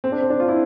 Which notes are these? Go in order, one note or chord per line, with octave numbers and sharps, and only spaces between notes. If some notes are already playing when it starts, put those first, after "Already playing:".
C4
D4
C4
D4
F4
E4